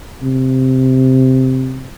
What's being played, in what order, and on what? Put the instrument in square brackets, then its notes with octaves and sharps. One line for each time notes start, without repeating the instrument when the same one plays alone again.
[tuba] C3